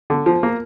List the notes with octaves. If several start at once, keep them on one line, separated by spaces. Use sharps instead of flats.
D3
F3
A#3